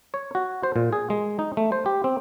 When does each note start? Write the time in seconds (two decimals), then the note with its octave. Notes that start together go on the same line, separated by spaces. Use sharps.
0.14 C#5
0.35 F#4
0.63 C5
0.76 A#2
0.93 G#4
1.10 G#3
1.39 D#4
1.57 A3
1.72 C5
1.86 G4
2.04 C4